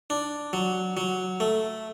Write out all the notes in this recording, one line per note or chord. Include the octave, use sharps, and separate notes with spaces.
D4
F#3
F#3
A3